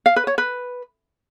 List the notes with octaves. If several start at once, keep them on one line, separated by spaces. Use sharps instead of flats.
F5
B4
C#5
B4